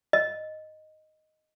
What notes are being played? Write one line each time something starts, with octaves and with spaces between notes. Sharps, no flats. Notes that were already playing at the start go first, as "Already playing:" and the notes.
D#5